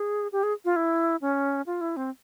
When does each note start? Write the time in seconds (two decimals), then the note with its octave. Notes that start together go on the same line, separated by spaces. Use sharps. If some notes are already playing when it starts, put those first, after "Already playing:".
Already playing: G#4
0.32 G4
0.43 G#4
0.65 F4
0.76 E4
1.21 C#4
1.66 F4
1.81 E4
1.97 C4